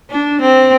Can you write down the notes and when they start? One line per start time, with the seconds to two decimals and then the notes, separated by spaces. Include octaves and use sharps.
0.10 D4
0.41 C4